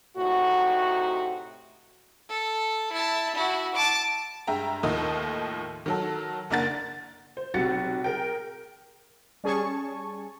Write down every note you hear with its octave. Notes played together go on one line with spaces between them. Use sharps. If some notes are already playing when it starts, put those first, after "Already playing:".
A2 C3 D#4 F#4
A4
E4 A5
E4 F#4
A5 D6
G2 G#3 E5 G5 A#5
D#2 A2 D#3 F3 D#5
D#3 F#3 A4
F#1 A#3 D4 A#4 F#5 A6
C5
B1 C3 F#4 G4 A6 C#7
G#4 A#4 G5
G3 C#4 G#4 G#5 A5 C#6